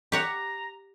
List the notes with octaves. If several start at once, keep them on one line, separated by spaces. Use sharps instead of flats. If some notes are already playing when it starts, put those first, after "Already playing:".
G4 C#5 F#5 A#5